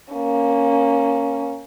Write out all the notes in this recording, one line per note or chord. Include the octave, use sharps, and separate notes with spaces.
A#3 C#4